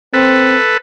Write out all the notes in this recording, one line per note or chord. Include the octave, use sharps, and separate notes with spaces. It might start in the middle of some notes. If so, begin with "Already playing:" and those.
C4 A4 B4